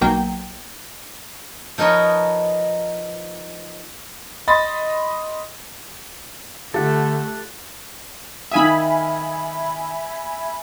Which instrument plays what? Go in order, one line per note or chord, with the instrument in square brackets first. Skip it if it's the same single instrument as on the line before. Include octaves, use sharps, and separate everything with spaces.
[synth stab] B1 F#3 A#3 G5
[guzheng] F3 D#4 A#4 B4 C#5 D#5
[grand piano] D#5 B5 C6 A6
[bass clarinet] D3 [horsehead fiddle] A3 [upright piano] F4 G4 [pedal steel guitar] A4 F#5
[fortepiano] D#3 F5 D#6 [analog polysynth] E5 G#5 B5